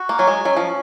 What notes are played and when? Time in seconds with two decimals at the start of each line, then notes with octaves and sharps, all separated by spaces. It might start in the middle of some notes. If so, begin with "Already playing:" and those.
Already playing: F#4
0.09 A#3
0.18 F#3 G#5
0.28 G#3
0.45 F#3 C#4
0.57 F3